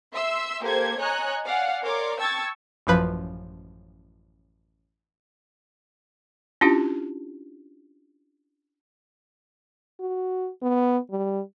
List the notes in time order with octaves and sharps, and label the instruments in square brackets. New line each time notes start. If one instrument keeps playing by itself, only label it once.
[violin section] E5 C6 E6
A#3 G4 A4 C5 G#6
C#5 D#5 G#5 A#5 F#6
D5 F5 F#5 G#5
A#4 C#5 D5 C6 D6
G5 A5 C#6 E6 G#6 A6
[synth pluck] A1 F#2 F3 B4
[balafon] C#4 D4 E4 F4 G4
[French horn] F#4
B3
G3